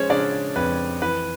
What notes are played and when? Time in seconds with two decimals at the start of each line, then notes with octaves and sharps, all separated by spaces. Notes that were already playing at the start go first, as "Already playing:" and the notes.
Already playing: F3 G#3 C#4 C5 C#5
0.10 C#3 D4 D5
0.56 F2 B4
1.02 E3 B4